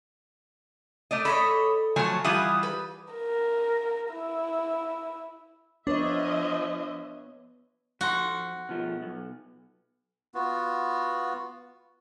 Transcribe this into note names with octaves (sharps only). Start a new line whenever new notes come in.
A3 D5 D#5
A4 C#5 D#5 B5
F3 F#3 A3 G#5 A5
E3 G3 E4 F4 F#5 D#6
B4
A#4
E4
F3 B3 D4 B4 C#5 D#5 E5
F2 F#4 C6
B2 F3
B1
B3 F4 F#4